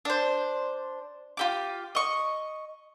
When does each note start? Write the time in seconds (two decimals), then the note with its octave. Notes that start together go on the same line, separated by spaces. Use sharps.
0.05 D4 C5
1.37 F4 G4 D6
1.95 D#5 C#6